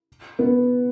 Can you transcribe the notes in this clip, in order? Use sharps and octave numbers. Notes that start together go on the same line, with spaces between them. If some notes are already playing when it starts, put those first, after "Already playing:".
B3